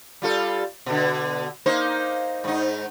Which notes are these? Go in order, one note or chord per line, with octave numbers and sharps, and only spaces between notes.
G3 F4 A4
B2 D3
A#3 D#4 C5
G#2 D#4